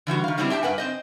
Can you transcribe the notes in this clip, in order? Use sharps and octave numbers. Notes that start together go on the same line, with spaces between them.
D3 E3 G3 F#4
D#3 F5
F#3 G3 B3 C4 D4 E4
G4 E5 G5 A5
G2 B4 F#5 G#5
C4 C5 D#5